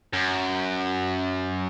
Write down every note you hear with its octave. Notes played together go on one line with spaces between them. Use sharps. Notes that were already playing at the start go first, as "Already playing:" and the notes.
F#2